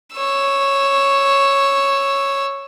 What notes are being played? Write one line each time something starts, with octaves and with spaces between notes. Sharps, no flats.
C#5 E6